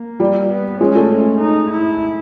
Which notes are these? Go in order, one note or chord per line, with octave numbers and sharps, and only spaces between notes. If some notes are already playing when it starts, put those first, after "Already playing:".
Already playing: A#3
G3
B3
G#3 C#4
A3
C#4
D#4
E4